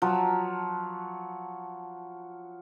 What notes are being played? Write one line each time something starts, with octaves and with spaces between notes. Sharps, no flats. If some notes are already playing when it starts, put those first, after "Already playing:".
F3 F#3